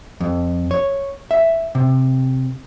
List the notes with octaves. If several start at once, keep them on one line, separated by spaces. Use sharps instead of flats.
F2
C#5
E5
C3